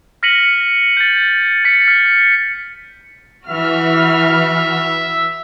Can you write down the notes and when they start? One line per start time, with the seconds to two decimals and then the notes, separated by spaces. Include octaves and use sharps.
0.23 F6 A#6 B6 C#7 D#7 F#7
0.43 A#6
0.97 G6 A6
1.65 A6 B6 C#7
1.88 F6
3.48 E3 F#4 E5 F6